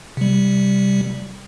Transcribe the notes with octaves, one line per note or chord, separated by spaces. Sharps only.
C3 G3